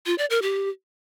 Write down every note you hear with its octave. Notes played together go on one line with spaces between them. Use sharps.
F4
D5
A#4
G4